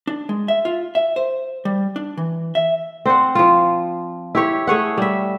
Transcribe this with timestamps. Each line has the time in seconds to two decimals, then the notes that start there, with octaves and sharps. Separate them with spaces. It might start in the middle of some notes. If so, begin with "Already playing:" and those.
0.07 D4
0.29 G#3
0.48 E5
0.65 F4
0.95 E5
1.16 C5
1.65 G3
1.96 D4
2.17 E3
2.55 E5
3.06 C4 C5 D5 F#5
3.35 F3 F4
4.35 E4 G4 C#5
4.67 A3 G#4 C#5 F#5
4.98 G3 E5